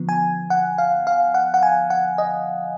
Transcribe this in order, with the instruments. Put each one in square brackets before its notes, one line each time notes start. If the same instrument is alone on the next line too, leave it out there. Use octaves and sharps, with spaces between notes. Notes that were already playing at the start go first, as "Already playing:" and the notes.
Already playing: [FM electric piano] D3 F3 B3
G#5
F#5
F5
F5
F#5
F#5
G#5
F#5
D#5